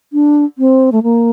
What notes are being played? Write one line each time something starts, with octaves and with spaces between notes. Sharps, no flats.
D4
C4
A3
A#3